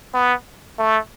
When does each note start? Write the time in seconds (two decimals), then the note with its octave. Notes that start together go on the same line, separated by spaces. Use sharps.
0.14 B3
0.79 A3